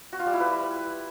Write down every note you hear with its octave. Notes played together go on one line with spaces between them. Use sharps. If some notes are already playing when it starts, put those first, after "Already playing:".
F#4
F4
G3
E4
B4